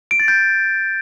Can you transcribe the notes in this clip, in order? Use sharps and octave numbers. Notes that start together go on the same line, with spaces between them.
D7
A6
G6